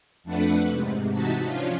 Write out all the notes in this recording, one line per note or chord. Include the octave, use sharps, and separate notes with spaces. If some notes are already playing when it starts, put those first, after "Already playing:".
F2 A3 D4 B4 F#5
G#2 C3
C3 E3 D#4 F#4 A5 B6
F3 C#4 D4 F4